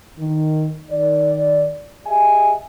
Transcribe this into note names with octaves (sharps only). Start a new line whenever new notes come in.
D#3
D#3 D5
G4 G#4 D#5 E5 G#5